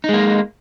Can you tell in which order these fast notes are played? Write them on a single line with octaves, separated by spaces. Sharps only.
D#4 G#3 A#3